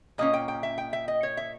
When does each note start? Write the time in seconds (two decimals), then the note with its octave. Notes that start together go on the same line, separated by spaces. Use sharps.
0.18 A#2 A#3 C#4 D#5
0.34 G5
0.48 G5
0.63 E5
0.78 G5
0.93 E5
1.08 D#5
1.23 C#5
1.37 E5